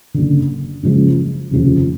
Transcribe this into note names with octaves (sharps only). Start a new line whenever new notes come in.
F#1 F#2 D3
F#1 F#2 C#3 F3 G#3
F1 D#2 C#3 F3